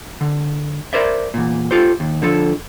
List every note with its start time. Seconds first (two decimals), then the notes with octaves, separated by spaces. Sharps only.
0.21 D3
0.93 A#4 C5 D5 E5
1.34 E2 A#2
1.71 F4 G4 A4 C5
2.00 D#2
2.22 D3 F3 A4